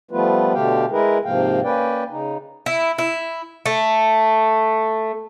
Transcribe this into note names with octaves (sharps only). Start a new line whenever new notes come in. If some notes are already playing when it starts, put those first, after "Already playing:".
F3 G3 A3 B3 F4 B4
B2 D3 A3 G4 F5 G5
G#3 E4 G#4 A#4 B4
G#2 C3 F3 A#3 F5 G5
A#3 C#4 B4 D5 G5
C#3 D#4
E4
E4
A3